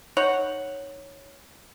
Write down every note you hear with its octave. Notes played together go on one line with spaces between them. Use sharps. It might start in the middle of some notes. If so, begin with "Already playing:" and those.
D#4 C#5 F#5